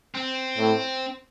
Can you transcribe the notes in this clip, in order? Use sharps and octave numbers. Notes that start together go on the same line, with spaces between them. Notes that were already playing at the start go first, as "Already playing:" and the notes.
C4
A2